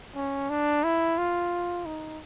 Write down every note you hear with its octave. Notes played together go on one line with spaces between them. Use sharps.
C#4
D4
E4
F4
D#4